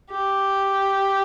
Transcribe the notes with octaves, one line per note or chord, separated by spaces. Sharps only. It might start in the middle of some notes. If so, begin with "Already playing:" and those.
G4